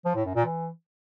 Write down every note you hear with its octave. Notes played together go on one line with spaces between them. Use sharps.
F3
A2
F#2
A#2
E3